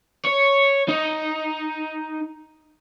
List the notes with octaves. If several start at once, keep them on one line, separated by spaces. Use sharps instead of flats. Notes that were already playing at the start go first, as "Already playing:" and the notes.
C#5
D#4